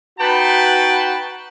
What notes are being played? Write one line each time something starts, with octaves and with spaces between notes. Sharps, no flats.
D#4 F#4 B4 G5 A5 B5